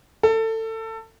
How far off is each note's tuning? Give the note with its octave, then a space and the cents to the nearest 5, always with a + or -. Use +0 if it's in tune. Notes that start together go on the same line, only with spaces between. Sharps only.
A4 +25